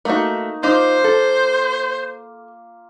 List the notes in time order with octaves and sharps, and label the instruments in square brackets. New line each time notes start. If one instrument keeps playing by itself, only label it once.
[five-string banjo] A3 F#4 [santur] A#3 D#4 C#6
[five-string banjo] D#4 [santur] F4 D6 [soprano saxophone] C5
[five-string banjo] A4